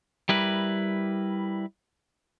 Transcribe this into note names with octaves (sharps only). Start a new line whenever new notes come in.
G3 E4 A#4 B4